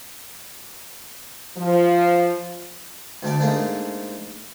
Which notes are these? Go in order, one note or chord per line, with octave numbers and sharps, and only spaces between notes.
F3
D2 A3 D5
G#2 A3 A#3 D4